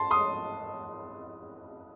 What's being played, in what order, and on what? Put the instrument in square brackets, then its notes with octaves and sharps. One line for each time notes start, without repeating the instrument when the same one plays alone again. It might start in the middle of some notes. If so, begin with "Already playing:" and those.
Already playing: [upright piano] A5 C6
C6 D#6